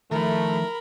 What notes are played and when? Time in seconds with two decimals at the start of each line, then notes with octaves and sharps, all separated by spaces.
0.11 D#3 F3 A3 A#4 B5